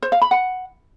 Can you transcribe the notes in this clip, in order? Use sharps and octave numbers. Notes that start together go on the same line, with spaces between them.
C5
F5
B5
F#5